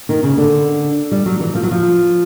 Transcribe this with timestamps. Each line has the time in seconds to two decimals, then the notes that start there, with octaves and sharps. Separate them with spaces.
0.09 D#3
0.23 C#3
0.37 D3
1.12 G3
1.26 F#3
1.40 E3
1.55 F3
1.63 F#3
1.71 F3